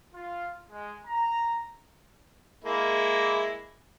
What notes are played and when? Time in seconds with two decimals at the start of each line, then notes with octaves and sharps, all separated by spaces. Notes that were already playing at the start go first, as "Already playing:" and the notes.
0.13 F4
0.69 G#3
1.06 A#5
2.64 G#3 A#3 E4